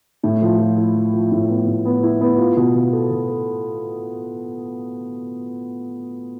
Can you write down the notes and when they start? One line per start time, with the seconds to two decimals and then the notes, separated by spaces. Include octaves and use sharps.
0.23 A2
0.42 F3
0.59 F3
0.77 E4
0.95 F3
1.13 F3
1.32 A2
1.49 B3
1.67 A2
1.85 B3
2.03 E4
2.21 B3
2.38 F4
2.57 B2
2.74 B2
2.93 A4
3.11 B2
3.29 A4